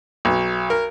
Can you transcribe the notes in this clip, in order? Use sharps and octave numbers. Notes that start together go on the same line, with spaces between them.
B1
A#4